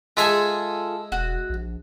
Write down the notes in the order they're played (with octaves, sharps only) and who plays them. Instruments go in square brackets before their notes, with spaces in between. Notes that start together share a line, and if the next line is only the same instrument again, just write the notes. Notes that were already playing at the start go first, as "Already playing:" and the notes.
[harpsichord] G#3 E5 G#5 [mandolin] F4 G#4 A4
[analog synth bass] E1 [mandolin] F#4
[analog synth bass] A#1